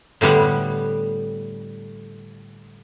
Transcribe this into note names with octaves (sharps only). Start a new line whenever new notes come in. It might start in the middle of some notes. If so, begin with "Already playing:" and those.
A2 D3 G3 B3 F#5